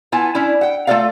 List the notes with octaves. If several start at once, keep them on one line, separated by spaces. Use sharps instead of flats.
B3 E4 F4 G#5 A5
C#4 D4 E4
F#5 G5
A3 F4 A4 A#4 D5 F5